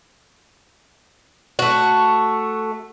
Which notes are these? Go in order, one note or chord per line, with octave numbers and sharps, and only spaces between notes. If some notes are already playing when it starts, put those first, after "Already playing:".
A3 F#4